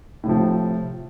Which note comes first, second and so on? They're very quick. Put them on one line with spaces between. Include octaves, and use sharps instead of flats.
A2 C3 F3